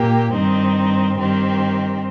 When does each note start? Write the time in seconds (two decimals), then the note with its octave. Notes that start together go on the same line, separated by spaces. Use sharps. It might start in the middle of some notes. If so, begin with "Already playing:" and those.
Already playing: A#2 A#3 G4
0.31 G2 D#3 C4 D#4
1.17 G2 D#3 C4 G4